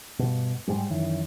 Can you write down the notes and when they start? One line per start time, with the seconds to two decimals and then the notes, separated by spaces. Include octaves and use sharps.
0.19 G2 B2
0.67 G#2 G3 G#3
0.90 F#2 D#3 E3